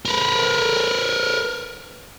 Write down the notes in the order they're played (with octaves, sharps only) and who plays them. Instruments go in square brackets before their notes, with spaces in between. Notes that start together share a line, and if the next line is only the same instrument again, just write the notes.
[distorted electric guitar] A#4 B4